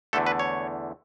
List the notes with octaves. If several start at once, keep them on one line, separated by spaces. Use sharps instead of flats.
E2 D3 A3 A4
B4
C#5